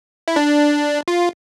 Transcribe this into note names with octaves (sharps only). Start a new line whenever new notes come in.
E4
D4
F4